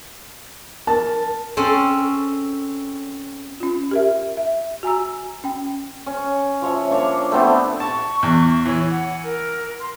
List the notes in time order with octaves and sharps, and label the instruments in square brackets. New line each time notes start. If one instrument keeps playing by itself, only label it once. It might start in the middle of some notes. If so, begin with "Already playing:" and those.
[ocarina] A#4 [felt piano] A5
[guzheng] C4 C#4 A4
[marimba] C#4 F4
G4 A#4 E5
E5
F#4 G#5 A#5 E6
C#4 G5
[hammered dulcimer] C#4
F3 C#5 E5
A#3 D4 C#5
A3 B3 C4 D4
[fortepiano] A5 [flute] C#6
[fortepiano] E2
[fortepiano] E3 [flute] C#5
[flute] F#5
A#4
C6